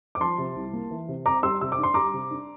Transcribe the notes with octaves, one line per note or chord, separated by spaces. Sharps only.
D6
F3 A5 C6
C3
C2
A#3
E3
C3
C4 A#5 D6
G3 C6 E6
C3 E6
D6
D4
C6
G3 A#5 D6
C3
D4